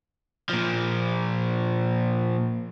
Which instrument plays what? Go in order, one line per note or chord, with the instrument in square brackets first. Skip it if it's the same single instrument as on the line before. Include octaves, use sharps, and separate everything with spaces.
[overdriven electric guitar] A#2 F3